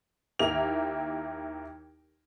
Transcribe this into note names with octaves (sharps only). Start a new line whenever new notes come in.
D#2 A#3 E4 G4 F7